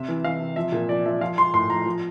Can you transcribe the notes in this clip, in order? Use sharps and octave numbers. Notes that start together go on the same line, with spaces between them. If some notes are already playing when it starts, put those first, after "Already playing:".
Already playing: C3 E5
E3
E3 F5
C3
F3 E5
A#2
F3 D5
F3 E5
F3 F5
F3 C6
A2 C6
F3 A#5
F3